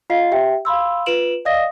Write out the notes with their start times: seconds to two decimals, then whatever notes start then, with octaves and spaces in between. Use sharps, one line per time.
0.10 F4 D#5 F5 C7
0.31 G4 E5 G5
0.65 F5 B5 C6 E6
1.06 F4 B4 D7 E7 F#7
1.45 D5 D#5 F5 D#6 A#6